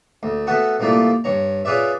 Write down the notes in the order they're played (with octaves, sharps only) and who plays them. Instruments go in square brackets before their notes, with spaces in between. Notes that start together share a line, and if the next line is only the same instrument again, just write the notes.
[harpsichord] D2
A3 B3 F#4 A4
C2 F3 A3 A#3 F4 D5
G2 C#5 A#5
C#4 F4 G#4 B4 D5 E5